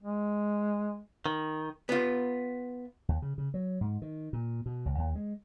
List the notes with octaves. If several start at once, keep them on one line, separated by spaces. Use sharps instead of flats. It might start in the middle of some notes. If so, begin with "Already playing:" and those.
G#3
D#3
B3 F4
D#2
C#3
C#3
F#3
G#2
D#3
A#2
B2
C#2
D#2
G#3